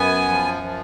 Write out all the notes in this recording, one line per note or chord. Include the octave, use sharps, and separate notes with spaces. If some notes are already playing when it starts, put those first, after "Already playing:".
Already playing: F#2 B3 G#5
F3
F3